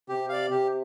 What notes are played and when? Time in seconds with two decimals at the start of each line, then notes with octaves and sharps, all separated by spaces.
0.09 C3 G4
0.29 D5 F5
0.51 C3 G4